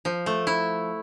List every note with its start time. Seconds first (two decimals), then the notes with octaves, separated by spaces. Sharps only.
0.05 F3
0.26 A3
0.47 E4